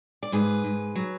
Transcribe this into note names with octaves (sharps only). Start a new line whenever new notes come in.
D5
G#2 G#4 B4
G#2
F#3